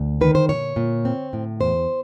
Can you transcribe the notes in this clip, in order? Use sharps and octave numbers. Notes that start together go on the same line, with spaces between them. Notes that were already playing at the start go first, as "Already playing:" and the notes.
Already playing: D2
D#3 B4
C5
A#2 C#5
A#2
C4
A2
E2 C5